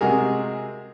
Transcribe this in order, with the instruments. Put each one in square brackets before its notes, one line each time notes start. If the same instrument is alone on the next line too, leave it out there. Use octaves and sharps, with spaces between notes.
[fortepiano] C3 G#3 F#4 G#4 A#4